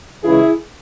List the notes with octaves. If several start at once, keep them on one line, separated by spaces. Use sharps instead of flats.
C#2 C#3 E3 E4 G#4